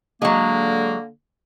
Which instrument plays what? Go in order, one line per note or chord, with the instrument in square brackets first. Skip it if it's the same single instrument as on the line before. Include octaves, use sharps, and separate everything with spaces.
[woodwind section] D3 A#3 [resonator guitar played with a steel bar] F#3 G#3